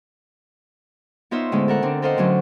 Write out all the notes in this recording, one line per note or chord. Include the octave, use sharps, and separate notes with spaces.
B3 D#4 F4 C5 C#5 E5
A2 D3 G#3 B3 C#4
A4 A#4 F#5
D3 C4 D4
A4 A#4 C5 D#5 F5 F#5
A2 D3 F#3 C#4